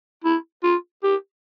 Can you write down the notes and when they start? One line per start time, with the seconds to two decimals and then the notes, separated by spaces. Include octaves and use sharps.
0.24 E4
0.63 F4
1.03 G4